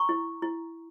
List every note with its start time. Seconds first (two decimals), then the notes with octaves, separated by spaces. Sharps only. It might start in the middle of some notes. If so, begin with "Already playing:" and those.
Already playing: A#5 C#6
0.09 E4
0.42 E4